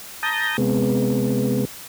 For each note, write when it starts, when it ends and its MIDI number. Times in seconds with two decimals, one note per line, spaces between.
0.23 0.57 81
0.23 0.57 82
0.23 0.57 87
0.23 0.57 91
0.23 0.57 94
0.58 1.65 48
0.58 1.65 56
0.58 1.65 59